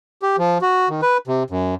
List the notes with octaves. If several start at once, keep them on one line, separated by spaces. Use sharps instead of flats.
G4
F3
F#4
D#3
B4
C3
F#2